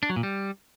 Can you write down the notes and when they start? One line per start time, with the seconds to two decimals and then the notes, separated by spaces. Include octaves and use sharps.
0.03 D4
0.10 F#3
0.16 A#2
0.23 G3